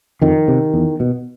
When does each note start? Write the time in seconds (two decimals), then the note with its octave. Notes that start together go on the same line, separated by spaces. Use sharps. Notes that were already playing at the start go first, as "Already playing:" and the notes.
0.22 F2 D#3
0.48 C3
0.74 E2
1.00 B2